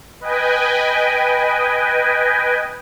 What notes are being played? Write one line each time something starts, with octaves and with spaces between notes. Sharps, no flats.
B4 D#5 G5 G#5